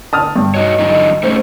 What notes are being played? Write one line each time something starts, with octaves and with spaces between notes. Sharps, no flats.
A5 D#6 F6
G2
D#4 F#4 C#5 D#5
D3 F#3 D#4 D#5
A3 C#4 D#4 C5